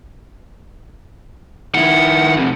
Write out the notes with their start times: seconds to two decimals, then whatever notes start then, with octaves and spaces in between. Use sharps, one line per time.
1.75 D#3 E4 F#5
2.37 F2 C3